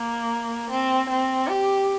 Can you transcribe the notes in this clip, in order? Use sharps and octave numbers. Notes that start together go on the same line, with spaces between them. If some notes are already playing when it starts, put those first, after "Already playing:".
Already playing: A#3
C4
C4
G4